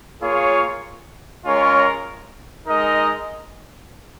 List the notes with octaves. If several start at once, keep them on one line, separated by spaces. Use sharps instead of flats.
A#3 F4 G#4 C#5
G#3 C#4 F4 A#4 C#5
G#3 D#4 A#4 D#5